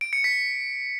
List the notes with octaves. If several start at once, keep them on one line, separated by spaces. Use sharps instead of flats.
D7
C#7
B6